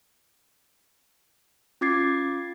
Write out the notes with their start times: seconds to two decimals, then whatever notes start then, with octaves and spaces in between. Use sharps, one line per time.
1.81 C#4 F4 D6 G#6 A6 C7